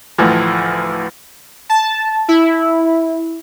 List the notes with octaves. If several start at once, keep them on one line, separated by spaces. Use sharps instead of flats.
D2 A2 E3 F3
A5
E4